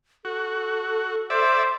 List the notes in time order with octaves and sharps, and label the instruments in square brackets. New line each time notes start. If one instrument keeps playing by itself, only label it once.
[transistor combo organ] F#4 [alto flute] A4
[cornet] C5 [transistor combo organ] D5 E5